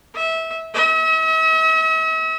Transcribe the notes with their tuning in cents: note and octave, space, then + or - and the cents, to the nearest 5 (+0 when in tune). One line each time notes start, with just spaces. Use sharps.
E5 -20
E5 -45